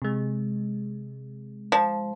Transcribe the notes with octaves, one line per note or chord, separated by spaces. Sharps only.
C3 G#3
F3